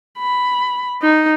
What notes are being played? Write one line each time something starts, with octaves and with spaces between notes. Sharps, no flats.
B5
D#4